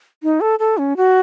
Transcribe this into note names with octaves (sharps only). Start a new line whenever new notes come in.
D#4
A4
A4
C#4
F#4